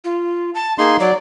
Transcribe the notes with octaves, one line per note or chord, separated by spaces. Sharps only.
F4
A5
A#3 D#4 G#4 C6
F#3 D5